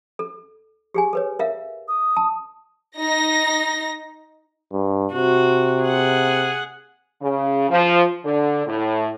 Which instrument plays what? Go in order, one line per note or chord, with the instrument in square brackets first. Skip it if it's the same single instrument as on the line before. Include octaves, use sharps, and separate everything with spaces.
[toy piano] A4
G4 G#4 G#5
A4 B4 C#5
A#4 E5 F5
[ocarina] D#6
[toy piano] A5
[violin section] D#4 A#6
[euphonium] G2
[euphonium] C3 [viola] F#4
[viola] G#4 F#5
[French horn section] C#3
F3
D3
A2